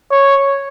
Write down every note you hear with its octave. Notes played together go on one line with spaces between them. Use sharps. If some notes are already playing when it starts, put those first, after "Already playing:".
C#5